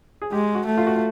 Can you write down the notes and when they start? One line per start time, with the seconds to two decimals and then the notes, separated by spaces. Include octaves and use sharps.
0.22 G#4
0.32 G#3 G4
0.55 F#4
0.66 A3
0.78 F4
0.87 F#4
0.96 F4